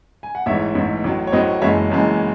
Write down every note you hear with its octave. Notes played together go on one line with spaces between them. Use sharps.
G#5
F#5
A1 G#2 E3 C#5 E5
A1 G#2 E3
A1 A2 F#3
C#5
A1 A2 F#3 C5 D#5
F#1 F#2 E3 G#3 C#5 E5
F#1 F#2 E3 G#3